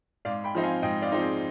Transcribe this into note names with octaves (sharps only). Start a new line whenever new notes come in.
G#2 D5 F5
G5 B5
F3 C4 D#4
F5 G#5
G#2 D#5 G5
D5 F5
F3 C4 D#4
G#4